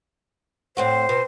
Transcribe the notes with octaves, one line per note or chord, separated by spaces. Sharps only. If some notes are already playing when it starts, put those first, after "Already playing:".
A2 C4 F#4 C5
B2